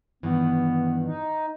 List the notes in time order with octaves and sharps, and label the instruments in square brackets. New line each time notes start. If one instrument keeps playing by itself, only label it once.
[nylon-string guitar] G2 D#3 E3 [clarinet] B3
[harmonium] D#4